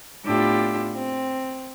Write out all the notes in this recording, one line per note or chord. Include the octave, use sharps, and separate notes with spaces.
A2 B3 D4 F4 G4 E6
C4